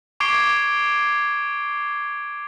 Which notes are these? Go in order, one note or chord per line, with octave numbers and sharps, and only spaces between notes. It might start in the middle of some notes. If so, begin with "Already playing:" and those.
C#6 D6 G#6 C7 D7 G7